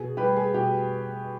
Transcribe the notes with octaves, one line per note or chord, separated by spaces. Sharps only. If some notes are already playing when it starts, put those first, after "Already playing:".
Already playing: B2 G#4
G3 G4 B4
G#4
B2 G4